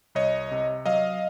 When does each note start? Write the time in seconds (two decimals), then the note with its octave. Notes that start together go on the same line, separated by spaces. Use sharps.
0.15 C2 C#5 D#5
0.51 C3
0.86 F#3 D#5 F5